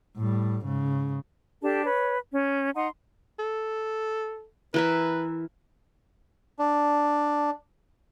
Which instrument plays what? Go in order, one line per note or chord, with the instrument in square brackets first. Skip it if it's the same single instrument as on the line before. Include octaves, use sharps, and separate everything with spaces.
[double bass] A2 G3
G#2 C#3
[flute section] D4 G4 A4 A5
B4 C#5
C#4
D#4 F#5 A#5 C6
[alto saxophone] A4
[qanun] E3 A#4 E5 [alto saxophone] B4
[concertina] D4